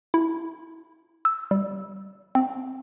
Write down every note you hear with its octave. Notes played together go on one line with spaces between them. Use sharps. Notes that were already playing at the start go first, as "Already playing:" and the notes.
E4
E6
G3
C4